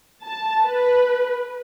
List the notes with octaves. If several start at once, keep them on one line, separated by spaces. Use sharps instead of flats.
A5
B4